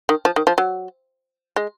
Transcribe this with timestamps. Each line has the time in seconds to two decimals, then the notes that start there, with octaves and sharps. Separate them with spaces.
0.09 D#3
0.25 F3
0.36 D#3
0.47 F3
0.58 F#3
1.56 G#3